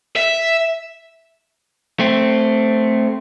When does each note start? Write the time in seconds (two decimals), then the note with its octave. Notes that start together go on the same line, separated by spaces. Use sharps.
0.16 E5
1.99 A3 C4